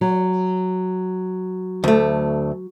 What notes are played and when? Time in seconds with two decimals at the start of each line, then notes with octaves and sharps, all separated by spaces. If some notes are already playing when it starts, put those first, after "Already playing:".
0.01 F#3
1.84 D2 A3